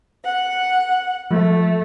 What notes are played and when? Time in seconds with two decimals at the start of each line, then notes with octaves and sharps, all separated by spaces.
0.23 F#5
1.31 F3 A3